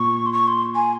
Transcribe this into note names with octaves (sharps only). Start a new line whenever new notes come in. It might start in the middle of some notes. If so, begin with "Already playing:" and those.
Already playing: A#2 C#6
C6
C#6
C6
G#5